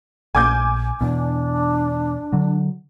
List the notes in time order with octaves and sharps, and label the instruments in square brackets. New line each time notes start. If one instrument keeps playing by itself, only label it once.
[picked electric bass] A#1 [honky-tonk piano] G#5 D6 G6
[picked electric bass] E2 B2 [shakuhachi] D4
[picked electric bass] D3 F#3